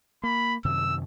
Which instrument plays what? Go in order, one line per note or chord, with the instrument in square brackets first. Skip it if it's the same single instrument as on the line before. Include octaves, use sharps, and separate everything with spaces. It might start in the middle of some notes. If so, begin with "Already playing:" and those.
[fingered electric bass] A#3 [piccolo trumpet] B5
[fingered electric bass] F#2 C3 D#3 [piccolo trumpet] E6